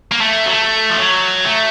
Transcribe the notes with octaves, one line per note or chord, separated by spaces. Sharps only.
A#3
A3
F#3
A3
F3
F#3
A3